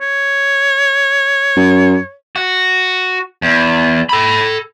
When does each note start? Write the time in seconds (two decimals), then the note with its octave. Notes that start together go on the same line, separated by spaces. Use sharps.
0.01 C#5
1.56 F#2
2.36 F#4
3.42 E2
4.09 A4 B5